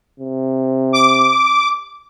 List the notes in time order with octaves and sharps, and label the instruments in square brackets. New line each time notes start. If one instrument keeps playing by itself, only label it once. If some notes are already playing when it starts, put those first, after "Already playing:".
[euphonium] C3
[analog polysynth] D6